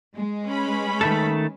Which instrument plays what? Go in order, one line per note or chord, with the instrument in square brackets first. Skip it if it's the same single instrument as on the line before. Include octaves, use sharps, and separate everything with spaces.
[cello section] G#3
[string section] C#4 B4 B5
[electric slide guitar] D#3 A3 A4